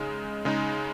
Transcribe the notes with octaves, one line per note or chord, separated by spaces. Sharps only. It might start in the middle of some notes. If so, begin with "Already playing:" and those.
Already playing: C#3 G#3 D#4
C#3 G#3 D#4